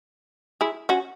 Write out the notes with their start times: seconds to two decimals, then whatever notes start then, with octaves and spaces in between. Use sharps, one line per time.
0.61 E4 G#4
0.89 C#4 F#4